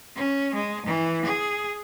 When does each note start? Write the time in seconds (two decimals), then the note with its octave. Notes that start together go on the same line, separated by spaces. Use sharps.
0.16 C#4
0.54 G#3
0.86 E3
1.25 G#4